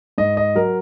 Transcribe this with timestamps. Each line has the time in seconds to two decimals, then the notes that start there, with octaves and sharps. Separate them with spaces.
0.18 G#2 D#5
0.37 D#5
0.55 F#3 A#4